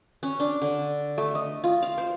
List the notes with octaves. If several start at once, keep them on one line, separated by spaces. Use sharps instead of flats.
C#4
D4
D3
A3
D#5
F4
F5
C5